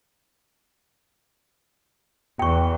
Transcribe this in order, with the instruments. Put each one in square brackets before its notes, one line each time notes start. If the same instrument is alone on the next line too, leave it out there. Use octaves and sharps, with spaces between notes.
[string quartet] E2 [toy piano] G5 C#6